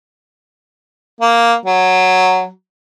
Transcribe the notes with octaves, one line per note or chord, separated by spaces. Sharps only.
A#3
F#3